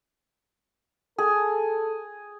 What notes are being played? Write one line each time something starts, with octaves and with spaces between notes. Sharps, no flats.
G#4 A4